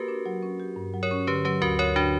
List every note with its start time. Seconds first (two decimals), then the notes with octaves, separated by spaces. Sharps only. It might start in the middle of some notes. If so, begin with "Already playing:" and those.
Already playing: A#3 F#4 G4 A#4 B4
0.08 D4
0.26 F#3
0.43 C#4
0.60 G4
0.76 G2
0.93 F#3
1.03 A#4 C#5
1.11 C#4
1.27 D3 G4 B4
1.45 F#3 G4 B4
1.61 D2 F#4 A#4
1.79 D2 A#4 C#5
1.96 D3 D4 F#4